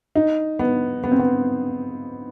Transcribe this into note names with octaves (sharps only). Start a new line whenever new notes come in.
D#4
B3
B3
C4
B3